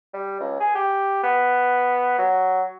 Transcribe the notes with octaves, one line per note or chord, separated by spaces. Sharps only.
G3
C#2
G#4
G4
B3
F#3